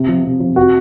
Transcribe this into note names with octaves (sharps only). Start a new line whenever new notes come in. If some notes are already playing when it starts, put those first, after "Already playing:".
Already playing: C3
F3
C3
F3
C3 F#4